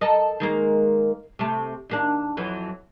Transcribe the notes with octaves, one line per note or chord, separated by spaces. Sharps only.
A4 A#4 D#5
D#3 G#3 A#3
C3 A3
D#2 A#3 D4
F2 E3 F#3